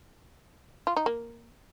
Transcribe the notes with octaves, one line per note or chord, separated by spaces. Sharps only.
F4
D#4
A#3